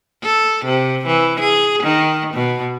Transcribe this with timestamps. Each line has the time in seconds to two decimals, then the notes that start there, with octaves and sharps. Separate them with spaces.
0.22 A4
0.65 C3
1.06 E3
1.40 G#4
1.83 D#3
2.33 B2